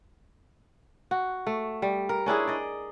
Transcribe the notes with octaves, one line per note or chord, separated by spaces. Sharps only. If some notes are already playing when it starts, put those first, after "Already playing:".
F#4
A3
G3
A#4
C#4 D4 E4 G#4
D5 D#5